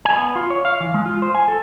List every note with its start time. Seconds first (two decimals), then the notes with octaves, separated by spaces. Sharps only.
0.05 G#5
0.17 B3
0.36 F4
0.50 C#5
0.65 F5
0.80 E3
0.94 G#3
1.06 F4
1.22 C5
1.35 G#5
1.48 A4